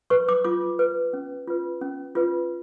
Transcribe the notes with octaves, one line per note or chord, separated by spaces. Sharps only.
B4 C#6
D6
F4 D6
B4
C#4
F4 B4
C#4
F4 B4